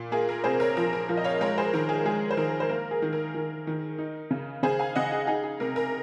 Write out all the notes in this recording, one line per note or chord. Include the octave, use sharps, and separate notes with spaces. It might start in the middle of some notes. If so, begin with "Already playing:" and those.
Already playing: A#2
A#3 G#4
A#4
C3 G#4 C5
A#4 C#5
F3 A#4
A#4
F3 A#4
D#5
C#5 F5
G#3 A#4 C#5
G#4 C5
D#3 A#4
G#4
G#3 G#4
C5
D#3 A#4
C5
A#3 A#4
G#4
D#3
A#4
D#3
D#3
D#4
C#3
C#3 G#4 C5
F5 G#5
C#3 D#5 F#5
G#4
D#4 G#4
G#4
C3 A#4
A#4